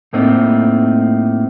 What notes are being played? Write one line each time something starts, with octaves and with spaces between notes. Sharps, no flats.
A2 A3 A#3 C4 D#4